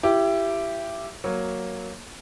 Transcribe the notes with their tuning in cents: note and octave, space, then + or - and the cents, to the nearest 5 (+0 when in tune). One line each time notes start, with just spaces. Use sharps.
E4 +25 G4 -5
F#3 +0 A#3 +0 C#5 +0